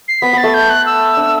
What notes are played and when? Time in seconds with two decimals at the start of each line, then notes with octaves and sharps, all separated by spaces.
0.08 C7
0.22 B3 B6
0.33 B3 A6
0.44 A3
0.54 G6
0.70 F#6
0.86 E6
1.17 D4